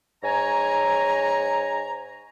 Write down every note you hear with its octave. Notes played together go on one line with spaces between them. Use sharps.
G#2 C#5 G#5 A#5